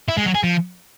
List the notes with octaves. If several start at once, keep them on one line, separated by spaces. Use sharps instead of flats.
E4
G#3
F#3
G#4
F3